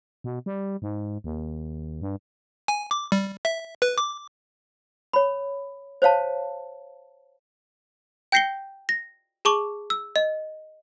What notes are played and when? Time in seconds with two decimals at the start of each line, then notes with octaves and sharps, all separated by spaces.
0.24 B2
0.46 G3
0.82 G#2
1.24 D#2
2.01 G2
2.68 G#5
2.91 D6
3.12 G3
3.45 E5
3.82 B4
3.98 D6
5.13 C#5 B5
6.02 C5 C#5 F5 A5
8.32 G5 G6 A#6 C7 C#7 G7
8.89 A#6
9.45 G#4 A5 C#6 D6 F#7
9.90 E6
10.16 D#5